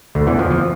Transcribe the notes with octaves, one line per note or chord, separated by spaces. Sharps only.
D2 D3
E2 E3
F2 F3
F3